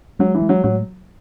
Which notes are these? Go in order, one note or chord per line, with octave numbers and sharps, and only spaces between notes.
F#3 G#3
E3
G#3
F#3
A2 F#3